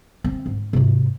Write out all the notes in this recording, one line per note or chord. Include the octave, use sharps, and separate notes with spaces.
C4
G#2
G#2 C3